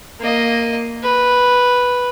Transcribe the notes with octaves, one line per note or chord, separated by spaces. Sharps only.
A#3 D#5
B4